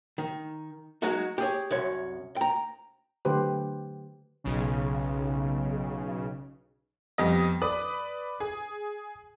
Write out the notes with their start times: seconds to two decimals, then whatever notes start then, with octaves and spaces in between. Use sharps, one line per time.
0.18 D#3
1.02 F#3 G#3 D#4 F#4
1.38 G4 G#4 C#5
1.71 C2 F#2 C#5
2.36 G5 A#5
3.25 D3 F#3 A3 G4 B4 C5
4.44 B1 C#3
7.18 F2 G3 B3 D#5
7.62 B4 D5 D#6
8.40 G#4